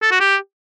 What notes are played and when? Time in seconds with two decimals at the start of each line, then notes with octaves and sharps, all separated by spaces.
0.03 A4
0.12 F#4
0.20 G4